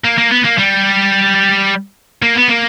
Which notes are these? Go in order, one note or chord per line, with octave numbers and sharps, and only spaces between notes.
A#3
A#3
B3
A#3
G3
A#3
B3
A#3